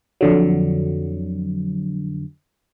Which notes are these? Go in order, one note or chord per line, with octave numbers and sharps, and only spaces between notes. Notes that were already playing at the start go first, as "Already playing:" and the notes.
F2 D3 F#3